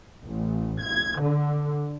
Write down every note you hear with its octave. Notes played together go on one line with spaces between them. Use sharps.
A1
G#6
D3